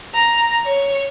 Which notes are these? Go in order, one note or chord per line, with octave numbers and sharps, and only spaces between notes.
A#5
C#5